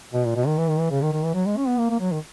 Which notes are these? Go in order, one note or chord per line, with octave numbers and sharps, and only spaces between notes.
B2
A#2
B2
D#3
E3
D#3
E3
C#3
D#3
D#3
E3
F#3
G#3
C#4
B3
A#3
A#3
F#3
D#3